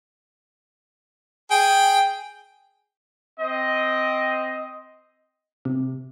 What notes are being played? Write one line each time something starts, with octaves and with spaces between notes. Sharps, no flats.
G#4 G5
C4 D#5
C3